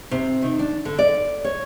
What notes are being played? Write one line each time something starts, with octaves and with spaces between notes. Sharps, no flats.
C3
D#3
D4
D3
D5
C#5